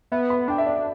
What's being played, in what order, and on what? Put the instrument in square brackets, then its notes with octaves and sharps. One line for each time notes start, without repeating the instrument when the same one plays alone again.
[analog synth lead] B3 [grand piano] E5
[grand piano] B5
[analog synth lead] D4 [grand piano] G5
[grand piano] E5
D5